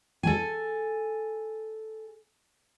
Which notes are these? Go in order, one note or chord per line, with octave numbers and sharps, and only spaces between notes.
A4 G#5